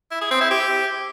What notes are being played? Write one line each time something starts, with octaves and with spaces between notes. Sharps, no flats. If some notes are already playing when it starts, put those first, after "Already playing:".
E4
G#4
C4
E4
G4